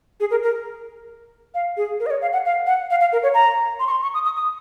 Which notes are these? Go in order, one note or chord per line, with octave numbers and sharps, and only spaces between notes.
G#4
A#4
A#4
F5
G#4
A#4
D#5
C#5
F5
F#5
F5
F#5
F5
F5
A#4
C#5
A#5
C6
C#6
C6
C#6
D#6
D#6
D#6